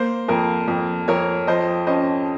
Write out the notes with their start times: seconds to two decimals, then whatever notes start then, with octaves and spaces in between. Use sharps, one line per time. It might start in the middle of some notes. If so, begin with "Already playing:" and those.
Already playing: A#3 C5
0.28 F2 A#4
0.68 F2
1.08 F2 A#4 C#5
1.47 F3 C5 D#5
1.87 C#4 C5 D#5